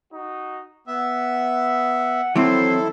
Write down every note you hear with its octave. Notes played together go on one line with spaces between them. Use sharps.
D#4 F#4
B3 E5 F#5
D#3 E3 F#3 C4 E4 A4 C5 C6